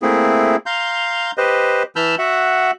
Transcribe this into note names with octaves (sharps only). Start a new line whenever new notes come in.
A3 A#3 C4 E4 G#4
F5 A#5 C6 G6
G4 B4 C5 D#5
E3 A5 B5 E6 F6 G6
F#4 E5 F#5